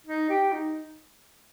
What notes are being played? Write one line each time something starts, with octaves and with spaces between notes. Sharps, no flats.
D#4
G4
D#4